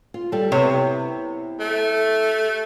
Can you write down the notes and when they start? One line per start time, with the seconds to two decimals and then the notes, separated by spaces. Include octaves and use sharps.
0.14 F4
0.32 G3 A4
0.52 C3 B3 E4 C#5
1.60 A3